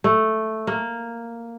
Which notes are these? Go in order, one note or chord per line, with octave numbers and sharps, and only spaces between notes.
A3
A#3